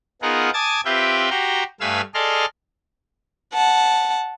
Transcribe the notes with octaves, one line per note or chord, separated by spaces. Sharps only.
B3 D#4 F4 G#4 A#4 F#5
G#5 A5 D6 D#6 G#6 A6
C4 F4 G4 B4 E5 G5
F#4 G4 A#5 C6
G2 A3 B4 F5 G#5 E6
G#4 A4 D5 D#5 C6 F6
F#5 A5